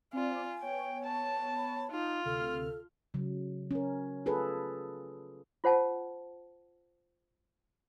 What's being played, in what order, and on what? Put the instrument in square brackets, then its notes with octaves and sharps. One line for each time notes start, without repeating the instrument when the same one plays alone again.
[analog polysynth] C4 D5 [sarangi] F4 [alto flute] G#5
[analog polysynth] B3 C#5 [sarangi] G5
[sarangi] A5
[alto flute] B5
[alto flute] D#4 [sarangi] F4
[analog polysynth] D2 C3 F6 [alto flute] A4
[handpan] C#3 F#3
C#4 A#4
F4 G#4 A4 B4
[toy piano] F4 C5 F#5 A5